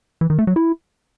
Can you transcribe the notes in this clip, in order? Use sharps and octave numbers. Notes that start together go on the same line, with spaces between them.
E3
D#3
A3
F#3
E4